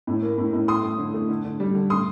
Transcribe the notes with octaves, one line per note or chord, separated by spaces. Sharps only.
A2
A#3
A2
A2
A3 C6 D#6
A3
D3
A3
D3
D3
G3
D3
A3 C6 D#6